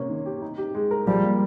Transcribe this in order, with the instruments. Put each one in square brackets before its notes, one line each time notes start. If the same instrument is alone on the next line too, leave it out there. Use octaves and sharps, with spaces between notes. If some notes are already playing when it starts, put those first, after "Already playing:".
Already playing: [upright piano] C3 A#3 C#4
D#3
G4
D#4
G4
G#3
A#4
[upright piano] F3 [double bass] G3
[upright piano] A#3